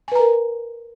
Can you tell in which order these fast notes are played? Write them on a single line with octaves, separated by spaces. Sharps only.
G#5 B4 A#5 A#4